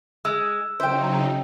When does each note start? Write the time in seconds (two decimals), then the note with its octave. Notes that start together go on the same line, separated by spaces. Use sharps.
0.25 G#3 E6
0.80 C#3 F#3 D#4 C5 E5 G5